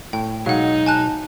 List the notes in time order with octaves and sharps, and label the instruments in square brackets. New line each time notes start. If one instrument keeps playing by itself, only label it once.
[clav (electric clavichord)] A2 [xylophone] G5
[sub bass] B2 [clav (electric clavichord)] F#3 G#3 [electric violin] D#4 [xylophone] F5 F#5
[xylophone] G#5 A5 F#6